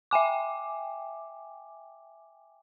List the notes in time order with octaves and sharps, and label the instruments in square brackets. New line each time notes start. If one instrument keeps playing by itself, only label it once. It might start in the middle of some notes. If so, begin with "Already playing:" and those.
[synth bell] E5 G5 G#5 D6